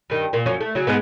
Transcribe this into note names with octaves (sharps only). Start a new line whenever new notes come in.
G2 D#3
A#2 A#3
F#2 F3 C#4
A3
C#3 F#3
G#2 G#3 B3